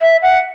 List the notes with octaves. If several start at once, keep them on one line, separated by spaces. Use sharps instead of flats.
E5
F#5